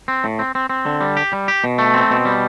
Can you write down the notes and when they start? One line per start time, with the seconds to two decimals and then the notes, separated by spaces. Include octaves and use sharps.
0.08 C4
0.24 A2
0.39 C4
0.55 C4
0.70 C4
0.86 D3
1.01 G3
1.17 G4
1.33 G3
1.48 G4
1.64 B2
1.78 A3
1.94 C4
2.11 B2
2.25 G3